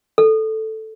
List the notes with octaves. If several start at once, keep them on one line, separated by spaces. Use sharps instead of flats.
A4